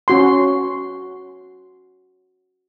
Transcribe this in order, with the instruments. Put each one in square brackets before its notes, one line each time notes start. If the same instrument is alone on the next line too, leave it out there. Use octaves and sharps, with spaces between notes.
[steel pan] C#4 F#4 C6